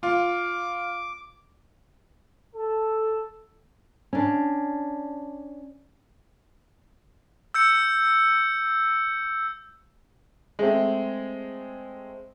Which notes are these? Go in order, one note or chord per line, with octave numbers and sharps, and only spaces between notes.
F4 D6
A4
C#4 D4
E6 G6 C#7
G#3 A3 C4